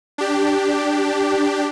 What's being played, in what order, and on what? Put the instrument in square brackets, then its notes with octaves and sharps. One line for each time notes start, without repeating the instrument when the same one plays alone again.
[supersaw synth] D4 G4